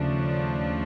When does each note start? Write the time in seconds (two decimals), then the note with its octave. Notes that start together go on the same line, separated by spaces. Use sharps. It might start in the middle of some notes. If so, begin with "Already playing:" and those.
Already playing: D#2 C#3 F3 A3 D4